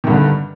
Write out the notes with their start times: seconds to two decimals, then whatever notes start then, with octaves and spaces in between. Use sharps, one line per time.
0.04 D#3
0.07 G2
0.10 D3